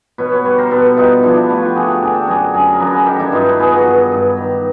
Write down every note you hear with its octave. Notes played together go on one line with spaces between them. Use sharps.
B2 B4 C#5
B4 C#5
G3 B4 C#5
A#4 C5
B2 A4 B4
G3 D#4 F4
F3 D4 E4
D4 E4
A3 E4 F#4
F4 G4
D3 F#4 G#4
G4 A4
D3 G#4 A#4
G4 A4
F#2 F#4 G#4
F#2 G#4 A#4
A#4
F#2 A4 B4
G#4 A#4
D#3 G4 A4
D4 E4
G2 D#4 F4
A4 B4
B3 G#4 A#4
F#4 G#4
G2
G2
D#3